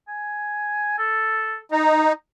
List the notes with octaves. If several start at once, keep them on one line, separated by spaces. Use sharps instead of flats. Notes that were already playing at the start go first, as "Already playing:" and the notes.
G#5
A4
D#4 A#5